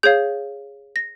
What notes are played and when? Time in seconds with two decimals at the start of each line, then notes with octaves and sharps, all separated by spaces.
0.03 G#4 C#5 F5 G6
0.96 A#6